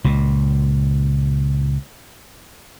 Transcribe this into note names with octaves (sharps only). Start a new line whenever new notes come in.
C#2 A#2